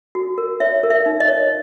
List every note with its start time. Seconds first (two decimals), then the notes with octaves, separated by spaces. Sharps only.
0.15 F#4
0.38 A#4
0.60 C#5 E5
0.83 A#4
0.90 E5
1.06 D#4
1.20 D#5
1.28 C#5